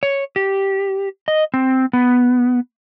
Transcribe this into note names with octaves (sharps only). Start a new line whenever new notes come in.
C#5
G4
D#5
C4
B3